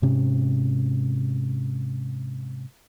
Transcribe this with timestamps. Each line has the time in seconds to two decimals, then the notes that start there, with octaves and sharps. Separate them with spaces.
0.02 G#2 C3 C#4